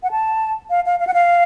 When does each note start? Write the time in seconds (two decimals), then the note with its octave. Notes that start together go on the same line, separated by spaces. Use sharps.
0.03 F#5
0.11 A5
0.70 F5
0.86 F5
1.00 F5
1.07 F#5
1.14 F5